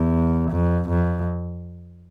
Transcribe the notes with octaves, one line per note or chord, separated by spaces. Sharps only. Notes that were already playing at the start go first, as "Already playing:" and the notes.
Already playing: E2
F2
F2